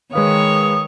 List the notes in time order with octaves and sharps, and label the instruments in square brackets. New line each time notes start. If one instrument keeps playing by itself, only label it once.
[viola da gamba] D#3 C#5 [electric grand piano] G#3 B4 F5 [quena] D#6